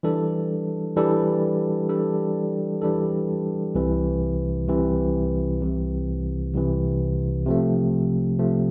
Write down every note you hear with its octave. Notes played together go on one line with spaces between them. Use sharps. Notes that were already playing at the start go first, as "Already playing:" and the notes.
E3 G3 D4 A4
E3 G3 D4 A4
E3 G3 D4 A4
E3 G3 D4 A4
C2 C3 E3
C2 C3 E3
C2 C3 E3
C2 C3 E3
C3 F3 A3
C3 F3 A3